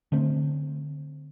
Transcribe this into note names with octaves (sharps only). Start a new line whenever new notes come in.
D3 A3 C4